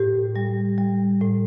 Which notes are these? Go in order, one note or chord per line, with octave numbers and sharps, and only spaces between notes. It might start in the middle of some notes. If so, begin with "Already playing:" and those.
Already playing: A2 G4
G3
G3
A2